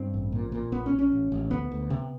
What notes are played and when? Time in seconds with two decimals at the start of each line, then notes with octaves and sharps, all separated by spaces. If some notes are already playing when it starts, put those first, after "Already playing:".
Already playing: G2 C4
0.14 A1
0.32 A#2
0.52 A#2
0.72 A#1 B3
0.86 C#4
0.92 A#1
0.99 C#4
1.12 A1
1.32 A1
1.51 D2 B3
1.71 D2
1.90 C3